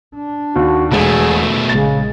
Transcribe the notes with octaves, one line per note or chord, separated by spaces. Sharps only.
D4
D#2 F#4
E1 B2 A3 G#4
A#1 C#3 G#3 A6